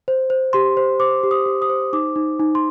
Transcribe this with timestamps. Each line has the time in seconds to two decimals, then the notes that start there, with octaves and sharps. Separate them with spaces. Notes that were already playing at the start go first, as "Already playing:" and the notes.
0.08 C5
0.30 C5
0.53 G4 C6
0.77 C5
1.00 C5 D6
1.23 G4
1.31 D#6
1.46 G4
1.62 D#6
1.69 C5
1.93 D#4 D6
2.16 D#4
2.40 D#4
2.55 C6